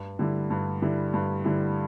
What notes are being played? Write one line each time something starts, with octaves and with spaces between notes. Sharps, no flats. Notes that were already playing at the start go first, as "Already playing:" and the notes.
Already playing: G2
D3 G3 E4
G2
D3 G3 E4
G2
D3 G3 E4